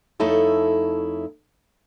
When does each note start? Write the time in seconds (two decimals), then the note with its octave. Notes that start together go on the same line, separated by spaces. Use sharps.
0.20 F2 A3 D#4 E4 A4 C#5